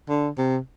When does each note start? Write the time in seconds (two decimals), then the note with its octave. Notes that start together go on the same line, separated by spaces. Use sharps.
0.09 D3
0.38 C3